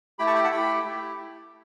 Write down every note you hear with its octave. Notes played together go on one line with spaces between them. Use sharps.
A3 E4 G4 G5 B5
A5 C#6
G5 B5
F#5 A5
A3 E4 G4 G5 B5
A3 E4 G4